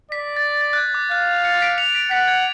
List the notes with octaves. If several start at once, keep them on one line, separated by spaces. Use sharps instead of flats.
D5 B6
A6
A6
F#6
G#6
D6
F5 F#6
A6 C#7
B6 D7
C#7 F7
B6 D7
F#5 B6
G#6